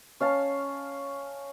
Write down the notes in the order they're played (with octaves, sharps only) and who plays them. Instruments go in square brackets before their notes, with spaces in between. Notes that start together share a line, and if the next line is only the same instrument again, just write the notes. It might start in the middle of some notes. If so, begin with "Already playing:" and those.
[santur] C#4 F5 A5